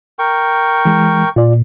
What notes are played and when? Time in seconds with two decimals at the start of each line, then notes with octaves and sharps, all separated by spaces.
0.19 A#4 G5 C#6
0.85 E3 G#3
1.36 A#2 F4 D5